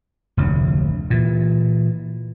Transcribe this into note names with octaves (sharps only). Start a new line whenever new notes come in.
F1 D2 A2 C3
A#2 E3